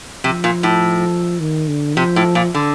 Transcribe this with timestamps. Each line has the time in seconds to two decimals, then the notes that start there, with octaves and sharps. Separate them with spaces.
0.24 C3 F3
0.44 A#2
0.63 A2
1.40 D#3
1.68 D3
1.97 C3 F3
2.16 A2
2.35 A#2
2.55 D3